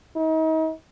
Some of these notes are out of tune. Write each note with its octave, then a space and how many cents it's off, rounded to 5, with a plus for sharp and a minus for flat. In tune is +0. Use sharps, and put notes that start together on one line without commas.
D#4 +35